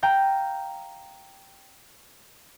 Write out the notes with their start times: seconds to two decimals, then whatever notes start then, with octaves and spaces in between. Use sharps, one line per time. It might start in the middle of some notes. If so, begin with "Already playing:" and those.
0.03 F5 G5 A#5 G6